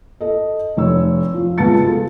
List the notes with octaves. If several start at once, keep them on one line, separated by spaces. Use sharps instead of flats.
A4 D#5
F1 C#5 E6
F3
C#2 G#3 B3 A5 A6 C#7
F4 F#4 A4